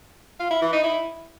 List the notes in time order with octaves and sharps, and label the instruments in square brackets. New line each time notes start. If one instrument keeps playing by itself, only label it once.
[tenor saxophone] F4
E4
E3
D#4
E4